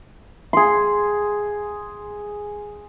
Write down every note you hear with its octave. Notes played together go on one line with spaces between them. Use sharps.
G#4 C6